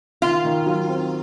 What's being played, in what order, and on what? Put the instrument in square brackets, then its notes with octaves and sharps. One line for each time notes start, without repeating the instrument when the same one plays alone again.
[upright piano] D#3 [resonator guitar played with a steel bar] F4
[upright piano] D#3
F#3
C4